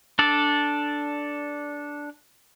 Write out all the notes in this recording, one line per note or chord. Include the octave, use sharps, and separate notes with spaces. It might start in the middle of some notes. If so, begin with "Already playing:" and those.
D4 A4 D5